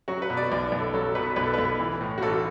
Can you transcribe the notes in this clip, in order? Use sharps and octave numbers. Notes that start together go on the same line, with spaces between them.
F#3 F#4
B4
B2
D5
B1 D5
B1
A4
F#3 A4
B2 B4
B1 B4
A4
B1 B4
E3
A2
F#4
A1 A4